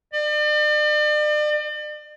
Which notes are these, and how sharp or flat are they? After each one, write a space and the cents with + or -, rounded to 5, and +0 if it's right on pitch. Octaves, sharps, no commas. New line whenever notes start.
D5 +40